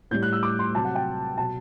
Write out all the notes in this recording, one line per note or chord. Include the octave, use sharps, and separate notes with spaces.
A2 G3 G6
F#6
E6
D6
C6
C3 F#3 A5
F#5
G5
B2 F#3 A5